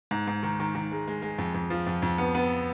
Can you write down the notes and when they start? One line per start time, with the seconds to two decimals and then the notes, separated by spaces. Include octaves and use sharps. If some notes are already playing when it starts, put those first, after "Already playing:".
0.11 G#2
0.27 G#2
0.43 D#3
0.60 D#3
0.75 D#3
0.92 G#3
1.08 G#3
1.22 G#3
1.38 F2
1.54 F2
1.70 F3
1.86 F2
2.02 F2
2.18 B3
2.35 B3